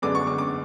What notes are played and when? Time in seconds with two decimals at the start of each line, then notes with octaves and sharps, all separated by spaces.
0.02 F#2 D3 G#3 B3 D4 D6
0.15 C#6
0.27 D6
0.38 D6